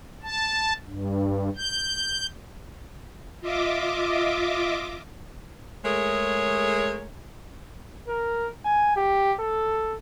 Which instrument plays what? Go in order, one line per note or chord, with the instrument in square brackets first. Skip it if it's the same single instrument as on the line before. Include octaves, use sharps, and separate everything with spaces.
[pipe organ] A5
G2
G6
[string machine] F4 D#5 E5 D6
[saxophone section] G#3 A3 G#4 A#4 C#5
[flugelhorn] A#4
G#5
G4
A4